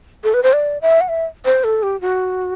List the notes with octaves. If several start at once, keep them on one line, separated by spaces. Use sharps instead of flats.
A4
B4
C5
D5
E5
F#5
E5
C5
A4
G4
F#4